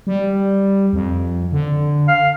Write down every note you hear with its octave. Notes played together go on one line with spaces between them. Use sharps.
G3
F2
D3
F5